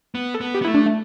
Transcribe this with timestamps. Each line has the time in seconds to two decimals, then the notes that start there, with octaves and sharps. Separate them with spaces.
0.15 B3
0.35 A4
0.41 B3
0.55 G4
0.62 B3
0.65 A3 E4
0.74 D4
0.86 A3